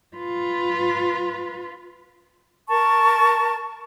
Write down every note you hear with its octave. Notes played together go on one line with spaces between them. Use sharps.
F4 B4
A#4 A5 C#6